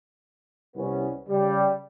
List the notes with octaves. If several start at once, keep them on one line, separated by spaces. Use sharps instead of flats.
C2 B3 C#4
C#3 G3